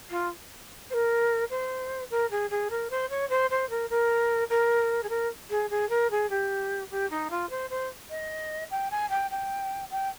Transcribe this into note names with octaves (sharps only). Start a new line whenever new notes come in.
F4
C5
A#4
C5
A#4
G#4
G#4
A#4
C5
C#5
C5
C5
A#4
A#4
A#4
G#4
A#4
G#4
G#4
A#4
G#4
G4
G4
D#4
F4
C5
C5
D#5
G5
G#5
G5
G5
G5